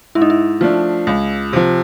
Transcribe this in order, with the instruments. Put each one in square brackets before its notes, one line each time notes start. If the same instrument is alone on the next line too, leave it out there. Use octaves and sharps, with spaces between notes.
[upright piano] G#2 [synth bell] E4
[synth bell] D#4
E4
[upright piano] F3 A3 D4 [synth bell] F4
[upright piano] C#2
C3 F3